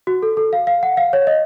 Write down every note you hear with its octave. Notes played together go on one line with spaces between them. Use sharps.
F#4
A4
A4
F5
F5
F#5
F5
C#5
D#5